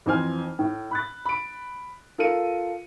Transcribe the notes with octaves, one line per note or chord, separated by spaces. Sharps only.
F2 E3 C5 G#5 F6
A2
B5 F#6 A6
B5 D7
F4 A4 A#4 C#7 D#7